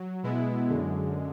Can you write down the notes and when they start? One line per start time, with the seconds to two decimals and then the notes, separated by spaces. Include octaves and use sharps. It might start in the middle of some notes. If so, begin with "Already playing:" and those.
Already playing: F#3
0.23 B2 G#3 B3 E4
0.69 F#2 D3 G#3